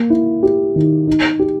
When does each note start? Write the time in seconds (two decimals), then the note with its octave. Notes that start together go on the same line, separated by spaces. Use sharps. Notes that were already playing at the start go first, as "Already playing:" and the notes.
Already playing: A#3
0.10 E4
0.43 G4
0.76 D#3
1.07 D#4
1.39 G4